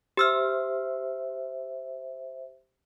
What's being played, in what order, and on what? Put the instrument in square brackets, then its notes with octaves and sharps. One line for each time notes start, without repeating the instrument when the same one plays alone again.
[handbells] G4 E6 F6 [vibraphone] C5 E5